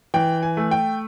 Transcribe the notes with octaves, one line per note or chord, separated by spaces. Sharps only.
E3 G5
G#5
A3
G5